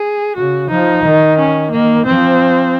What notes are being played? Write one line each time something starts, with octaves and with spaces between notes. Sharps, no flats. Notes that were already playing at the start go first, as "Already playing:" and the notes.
Already playing: G#4
C#3 F#4
F3 D#4
D#3
C#4
D#3 A#3
F3 C4